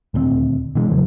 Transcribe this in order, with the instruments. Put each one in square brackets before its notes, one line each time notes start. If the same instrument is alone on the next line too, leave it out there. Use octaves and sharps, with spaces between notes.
[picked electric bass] D#1 D2 C4
B2 D3 E3 G#3
E2 G2 C#3 F#3